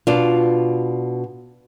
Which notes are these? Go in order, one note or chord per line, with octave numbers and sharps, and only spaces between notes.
B2 D4 F4